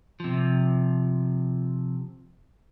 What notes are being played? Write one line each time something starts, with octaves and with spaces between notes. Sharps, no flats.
C3 F3